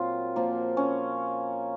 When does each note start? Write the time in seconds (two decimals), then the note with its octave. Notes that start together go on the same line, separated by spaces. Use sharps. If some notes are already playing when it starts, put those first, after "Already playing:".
Already playing: A#2 F#3 C4 F4
0.36 A#2 F3 A#3
0.77 C#4